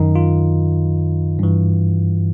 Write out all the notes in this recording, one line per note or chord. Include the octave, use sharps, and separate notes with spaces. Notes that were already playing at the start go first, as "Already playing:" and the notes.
Already playing: F#2 D#3 D#4
F4
G2 E3